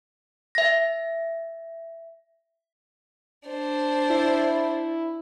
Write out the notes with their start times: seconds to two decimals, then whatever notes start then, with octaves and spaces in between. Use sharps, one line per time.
0.55 E5 A#6
3.48 D4 C5
4.10 E4